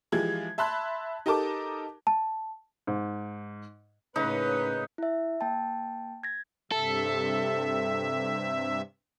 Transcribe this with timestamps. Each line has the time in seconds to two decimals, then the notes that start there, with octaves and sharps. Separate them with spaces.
0.12 E3 F3 G#3 G4 G#6
0.58 E5 A5 B5 C6 F#6
1.26 D#4 G4 A4 A#4 A5 D6
2.07 A5
2.87 G#2
4.16 A2 C#3 A#3 C#4 D#4 B4
4.98 E4 E5
5.41 A#3 G5 A5
6.23 G#6 A#6
6.71 G2 C3 A4 E5